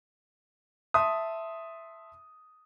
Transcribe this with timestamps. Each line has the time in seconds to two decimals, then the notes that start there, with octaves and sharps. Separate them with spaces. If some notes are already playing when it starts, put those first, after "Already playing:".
0.94 E5 A5 C6 D#6